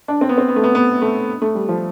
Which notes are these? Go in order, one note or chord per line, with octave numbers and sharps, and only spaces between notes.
D4
C4
B3
C4
B3
A3
B3
B3
A3
A3
G3
F3